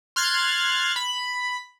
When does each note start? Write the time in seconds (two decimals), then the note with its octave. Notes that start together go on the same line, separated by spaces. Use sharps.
0.16 C6 F6 F#6 G#6 A6
0.96 B5